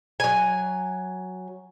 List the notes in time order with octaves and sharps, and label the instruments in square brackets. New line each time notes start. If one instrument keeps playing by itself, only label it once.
[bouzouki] F#3 G#5